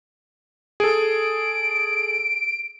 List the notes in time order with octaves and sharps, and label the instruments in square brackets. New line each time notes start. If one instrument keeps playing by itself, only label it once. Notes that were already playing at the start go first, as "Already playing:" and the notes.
[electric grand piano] G#4 A4 [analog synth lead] D7